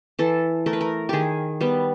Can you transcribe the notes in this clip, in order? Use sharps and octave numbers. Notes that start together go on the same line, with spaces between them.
E3 A4
A3 A#4
B4
A#4
D#3 G4 G#4
G3 B3